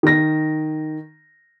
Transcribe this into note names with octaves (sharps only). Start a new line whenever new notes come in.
D#3 A#6